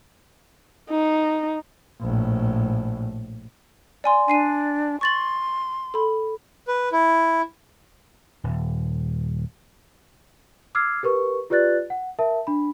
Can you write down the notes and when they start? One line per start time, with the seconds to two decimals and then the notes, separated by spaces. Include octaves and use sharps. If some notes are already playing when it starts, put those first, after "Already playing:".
0.90 D#4
2.01 A#1 A2
4.04 D5 G#5 C6
4.28 D4 G#5 C7 D#7
5.01 C6 C#6 A6 F#7
5.94 A4 B5
6.67 B4
6.92 E4
8.44 D#1
10.75 D6 E6 F6 G#6 C7
11.03 G4 A#4 B4 C#6
11.50 F4 G4 B4 D5 F#6 A6
11.90 F#5
12.19 A#4 E5 A5
12.47 D4 B5